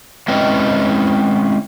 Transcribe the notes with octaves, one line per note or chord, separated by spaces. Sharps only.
G#3 C4 C#4 E4 B4 D#5